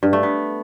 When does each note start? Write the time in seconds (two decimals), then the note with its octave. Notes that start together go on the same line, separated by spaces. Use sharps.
0.03 G2
0.13 A3
0.23 B3